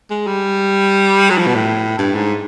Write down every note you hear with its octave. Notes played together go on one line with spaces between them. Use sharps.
G#3
G3
F#3
F3
B2
A2
G2
G#2